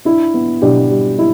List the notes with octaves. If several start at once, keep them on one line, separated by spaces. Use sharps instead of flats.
D4 E4
B3
B2 D4 G4
G3
E4